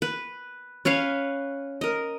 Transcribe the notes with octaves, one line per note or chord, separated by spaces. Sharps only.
B4
C#4 B4 C#5 F5
A#4 D#5